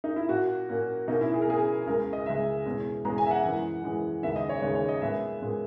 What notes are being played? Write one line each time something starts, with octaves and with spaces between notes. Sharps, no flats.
D#4
E4
A#2 A#3 C#4 F#4
A#2 A#3 C#4
B2 A#3 C#4 D#4
E4
G#4
A#4
B2 A#3 C#4 G#4
C#2 C#3 G#3 A#4
D#5
C#2 C#3 G#3 E5
E2 B2 G#3 C#4
E2 B2 G#3 C#4 A#5
G#5
E5
F#5
F#2 E3 G#3 C#4
F#2 E3 G#3 C#4
D#2 C#3 G#3 B3 E5
D#5
C#5
D#2 C#3 G#3 B3 C#5
C#5
D#5
A#2 G#3 B3 E5
A#2 G#3 B3